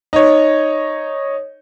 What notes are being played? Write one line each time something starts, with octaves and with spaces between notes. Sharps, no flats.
D#4 C#5